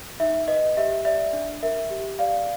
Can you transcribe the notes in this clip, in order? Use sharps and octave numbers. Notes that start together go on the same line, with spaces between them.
D#4 E5
B4 D#5
G4 E5
D5 E5
D4
A#4 E5
G4
D5 F5